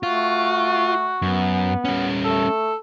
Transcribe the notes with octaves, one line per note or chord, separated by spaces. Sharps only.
A3 F4 F#4
F#2 B3
G3 C#4
A3 A4